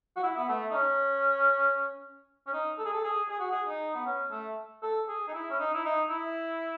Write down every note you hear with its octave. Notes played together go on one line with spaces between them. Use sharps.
F#4
E4
B3
A3
D#4
C#4
C#4
D#4
A4
G#4
A4
G#4
G#4
F#4
G#4
D#4
B3
C#4
A3
A4
G#4
D#4
E4
C#4
D#4
E4
D#4
E4